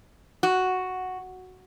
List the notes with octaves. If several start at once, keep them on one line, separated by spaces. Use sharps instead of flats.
F#4